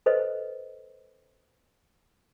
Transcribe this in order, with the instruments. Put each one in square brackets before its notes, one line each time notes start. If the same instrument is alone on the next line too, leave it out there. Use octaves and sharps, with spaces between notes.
[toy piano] A4 B4 C5 D#5